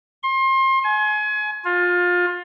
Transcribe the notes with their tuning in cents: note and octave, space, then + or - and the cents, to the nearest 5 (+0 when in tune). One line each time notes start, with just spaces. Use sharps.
C6 +30
G#5 +30
F4 +25